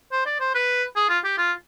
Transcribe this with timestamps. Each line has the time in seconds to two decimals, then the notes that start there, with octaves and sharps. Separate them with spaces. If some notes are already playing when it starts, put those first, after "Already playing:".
0.12 C5
0.26 D5
0.40 C5
0.55 B4
0.96 G#4
1.09 F4
1.24 G4
1.38 F4